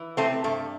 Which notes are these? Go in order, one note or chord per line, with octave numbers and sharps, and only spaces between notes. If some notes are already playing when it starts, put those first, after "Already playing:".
Already playing: E3
C3 A3 C4
G2 A3